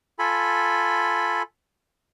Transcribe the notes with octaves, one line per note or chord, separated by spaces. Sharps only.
F4 A4 G#5 B5